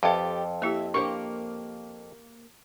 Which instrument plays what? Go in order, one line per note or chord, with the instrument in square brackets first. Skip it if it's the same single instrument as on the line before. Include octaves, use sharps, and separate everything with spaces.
[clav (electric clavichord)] F2 [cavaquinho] G4 A4 [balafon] B4 E5 F5
[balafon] A#3 E4 G4 [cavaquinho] E5
[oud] A#3 G4 C5 [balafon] D4 [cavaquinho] C#6